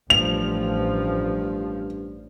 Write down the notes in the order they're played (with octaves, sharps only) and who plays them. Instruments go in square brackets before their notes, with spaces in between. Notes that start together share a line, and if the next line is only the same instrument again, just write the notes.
[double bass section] A1 F3 [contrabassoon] G2 [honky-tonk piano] F7